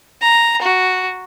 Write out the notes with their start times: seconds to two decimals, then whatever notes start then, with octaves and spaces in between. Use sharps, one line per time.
0.22 A#5
0.62 F#4